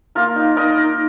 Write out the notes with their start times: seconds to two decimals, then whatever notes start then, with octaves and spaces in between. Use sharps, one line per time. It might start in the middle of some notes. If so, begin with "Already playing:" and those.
0.15 A#3 F4 A#4
0.36 D#4
0.56 D#4 A#4 D#5
0.77 D#4